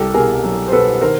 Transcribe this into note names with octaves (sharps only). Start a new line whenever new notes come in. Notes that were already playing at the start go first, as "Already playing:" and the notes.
Already playing: C2 G4 A4
B2 G#4 A#4
F#3
C5
B2 A4 B4
D#3 A#4 C5